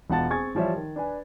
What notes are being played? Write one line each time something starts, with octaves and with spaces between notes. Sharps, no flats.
E1 B3 F4 F#5 A5 A6
C4 G#4 G#5 C#6 G#6 A6
E3 F3 G3 C#5 E5
D#3
D4 B4 G#5